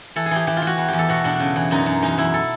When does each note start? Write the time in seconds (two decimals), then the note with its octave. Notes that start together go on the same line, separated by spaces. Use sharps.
0.16 E3 A4
0.26 G#4
0.31 E3 G4
0.47 E3 G4
0.57 F4
0.62 E3 F#4
0.78 E2
0.88 E2 G4
0.99 A4
1.09 B2 F#4
1.24 B2 D4
1.40 C#3
1.56 E3
1.71 F#2 D#4
1.86 F#2
2.02 E2 D#4
2.18 E2 E4
2.34 A4